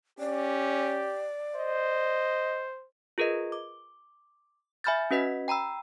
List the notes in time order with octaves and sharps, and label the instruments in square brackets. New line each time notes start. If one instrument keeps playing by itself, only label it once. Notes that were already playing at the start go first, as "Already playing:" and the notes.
[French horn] C#4 [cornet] G4 [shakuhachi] D5
[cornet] C5 [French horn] D#5
[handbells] F4 G#4 A#4 B4 D#5
D6
E5 G#5 B5 F6 G6 A6
C#4 F#4 B4 D#5 B6
G5 A#5 B5 E6